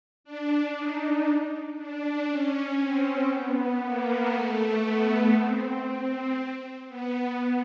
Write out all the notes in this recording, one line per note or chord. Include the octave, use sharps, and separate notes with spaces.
D4
D#4
D4
C#4
C4
B3
A#3
A3
B3
C4
B3